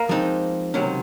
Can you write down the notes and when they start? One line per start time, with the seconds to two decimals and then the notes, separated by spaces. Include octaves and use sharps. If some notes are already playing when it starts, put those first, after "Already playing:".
Already playing: A#3
0.09 F3 G#3 C4 D#4
0.74 C#2 C3 D#3 F#3 C#4